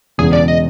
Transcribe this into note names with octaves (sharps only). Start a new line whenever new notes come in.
E1 E2 C#3 G#4
D5
D#5